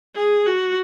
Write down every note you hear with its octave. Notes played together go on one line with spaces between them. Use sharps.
G#4
F#4